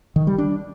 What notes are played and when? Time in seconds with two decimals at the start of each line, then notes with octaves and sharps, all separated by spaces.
0.16 D#3
0.27 G3
0.38 D4